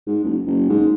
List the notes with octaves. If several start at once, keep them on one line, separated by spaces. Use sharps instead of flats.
G#2
F#1
F#1
G#2